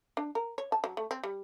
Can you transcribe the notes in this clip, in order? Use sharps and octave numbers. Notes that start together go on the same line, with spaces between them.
D4
A#4
C#5
A5
F#3
A3
C4
G3